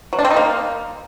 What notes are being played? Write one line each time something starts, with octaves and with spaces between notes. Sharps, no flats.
F#3
D4
C4
D#4
A#3